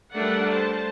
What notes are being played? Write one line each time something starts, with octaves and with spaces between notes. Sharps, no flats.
G3 A3 D4 A#4 D5 F#5
C5 A5